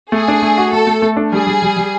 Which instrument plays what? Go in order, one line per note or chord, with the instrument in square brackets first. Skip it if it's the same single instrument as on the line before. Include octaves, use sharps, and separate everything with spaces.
[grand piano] A3 [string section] G#4
[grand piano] D4
A3
F#4
[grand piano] A3 [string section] A4
[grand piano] A3
A3
D4
[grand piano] G3 [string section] G#4
[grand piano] G3
G3
G3